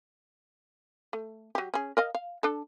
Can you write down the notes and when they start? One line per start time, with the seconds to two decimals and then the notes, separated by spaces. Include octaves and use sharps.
1.13 A3
1.55 F#3 G4
1.74 C#4 G#4
1.97 A#4 D#5 F5
2.15 F5
2.43 D4 A4